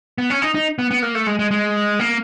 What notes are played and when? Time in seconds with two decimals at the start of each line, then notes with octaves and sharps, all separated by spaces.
0.18 B3
0.30 C#4
0.42 D#4
0.54 D#4
0.79 B3
0.91 B3
1.03 A#3
1.15 A3
1.26 G#3
1.39 G#3
1.51 G#3
1.99 A#3